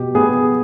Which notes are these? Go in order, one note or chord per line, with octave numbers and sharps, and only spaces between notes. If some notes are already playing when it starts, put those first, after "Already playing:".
Already playing: B2 G4
B3 G#4